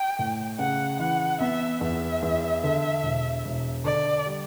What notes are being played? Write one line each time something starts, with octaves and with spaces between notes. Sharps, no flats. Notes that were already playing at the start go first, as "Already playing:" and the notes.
Already playing: G5
A2
C#3 F#5
E3 F#5
B3 E5
E2 E5
E2
D3
E1
E1
D3 D5
G3